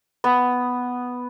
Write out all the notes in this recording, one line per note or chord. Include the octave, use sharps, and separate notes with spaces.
B3